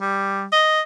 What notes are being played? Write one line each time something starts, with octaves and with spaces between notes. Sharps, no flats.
G3
D#5